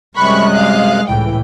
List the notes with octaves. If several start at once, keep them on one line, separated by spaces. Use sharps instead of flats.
F#2 C3 G3 G#3 B5 C#6 F#6
D#5 F5
C#2 A2 E3 G5